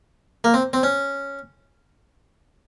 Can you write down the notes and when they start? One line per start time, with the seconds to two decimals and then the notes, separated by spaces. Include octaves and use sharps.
0.44 A#3
0.54 C4
0.73 C4
0.83 C#4